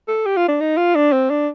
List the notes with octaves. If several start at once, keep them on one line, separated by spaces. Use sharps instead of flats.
A4
G4
F4
D4
D#4
F4
D4
C4
D4